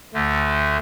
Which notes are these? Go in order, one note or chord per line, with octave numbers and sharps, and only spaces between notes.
D2 D3 A3